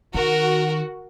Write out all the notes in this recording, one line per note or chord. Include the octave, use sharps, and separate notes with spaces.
D#3 F#4 A#4